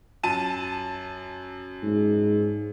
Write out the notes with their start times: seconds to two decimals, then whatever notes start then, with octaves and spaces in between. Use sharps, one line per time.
0.23 F#2 A5 D#7
1.82 G#2